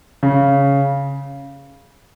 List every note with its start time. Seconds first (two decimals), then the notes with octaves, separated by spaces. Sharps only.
0.23 C#3